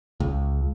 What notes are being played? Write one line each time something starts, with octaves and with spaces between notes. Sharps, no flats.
C#2